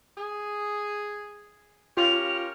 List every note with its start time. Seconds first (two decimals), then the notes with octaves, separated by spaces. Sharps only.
0.17 G#4
1.97 C#4 F4 G4 A#4 F7